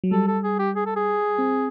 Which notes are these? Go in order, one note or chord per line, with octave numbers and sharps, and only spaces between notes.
F#3
G3 A4
A4
G#4
G4
G#4
A4
G#4
C4